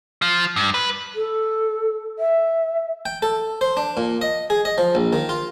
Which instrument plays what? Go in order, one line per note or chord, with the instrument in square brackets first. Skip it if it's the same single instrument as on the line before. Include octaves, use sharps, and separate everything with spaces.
[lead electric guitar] F3
G2
B4
[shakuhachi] A4
E5
[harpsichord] G5
A4
C5
D4
A#2
D#5
G#4
D#5
F3
A#1
D#3
F4